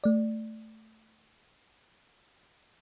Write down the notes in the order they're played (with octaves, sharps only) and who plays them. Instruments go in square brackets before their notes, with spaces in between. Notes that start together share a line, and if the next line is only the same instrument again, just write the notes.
[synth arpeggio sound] A3 D5